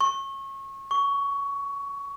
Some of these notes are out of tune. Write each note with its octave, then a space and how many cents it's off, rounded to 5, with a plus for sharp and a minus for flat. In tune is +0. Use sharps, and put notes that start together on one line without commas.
C#6 -30
C#6 +15